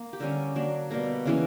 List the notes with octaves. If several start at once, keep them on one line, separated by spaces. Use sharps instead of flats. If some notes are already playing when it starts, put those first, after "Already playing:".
Already playing: A#3
G4
D3 G3 C#4 A#4
F#3 A#3 D4
B2 G3 A#3 A#4
C#3 E3 A#3 C#4 A#4